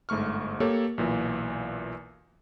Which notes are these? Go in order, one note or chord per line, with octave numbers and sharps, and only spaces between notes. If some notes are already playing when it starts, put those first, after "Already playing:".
G1 G#2 A3 C#6 F6
A#3 G4 A4 C#5
B1 A#2 E3